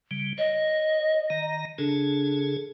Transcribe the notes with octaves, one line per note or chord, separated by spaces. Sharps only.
C#3 G3
C#5 D#5
D#3 A#5
C#3 D4 G#4 A4